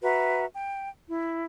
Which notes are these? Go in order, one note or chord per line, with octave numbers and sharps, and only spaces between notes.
F#4 B4 E5 A#5
G5
E4